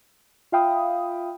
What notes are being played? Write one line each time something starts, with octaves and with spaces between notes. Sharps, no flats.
F4 E5 F5 G5 B5 D#6